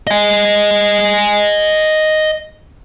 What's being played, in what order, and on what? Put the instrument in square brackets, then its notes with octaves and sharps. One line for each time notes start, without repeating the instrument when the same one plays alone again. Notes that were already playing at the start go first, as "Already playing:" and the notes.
[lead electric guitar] D#5 G#5